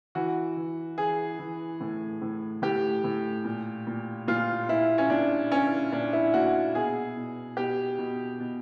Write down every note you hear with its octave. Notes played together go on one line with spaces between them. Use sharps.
E3 F#4
E3
E3 G#4
E3
A2
A2
A2 G4
A2
A#2
A#2
A#2 F4
A#2 E4
C#4
A#2 D4
A#2 C#4
A#2 D4
E4
A#2 F#4
B2 G#4
B2
B2 G4
B2
B2